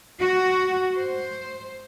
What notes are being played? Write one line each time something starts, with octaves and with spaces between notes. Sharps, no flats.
F#4
C5